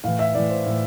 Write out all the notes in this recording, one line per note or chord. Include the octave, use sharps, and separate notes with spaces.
A2 E3 F5
E5
A2 E3 D5
C5
A2 E3